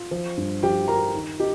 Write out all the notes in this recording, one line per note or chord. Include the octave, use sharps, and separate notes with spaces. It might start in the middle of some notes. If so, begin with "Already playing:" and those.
Already playing: F4
F3
G2
F3 G4 G5
G2 A#4 A#5
D#3
D#4 G4